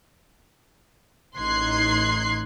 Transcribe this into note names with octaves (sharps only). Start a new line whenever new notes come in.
A1 D#4 C6 F#6 G#6 C7